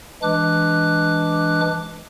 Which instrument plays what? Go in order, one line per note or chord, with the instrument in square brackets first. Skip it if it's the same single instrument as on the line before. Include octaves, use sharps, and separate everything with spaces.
[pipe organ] E3 G#3 D4 D6 F#6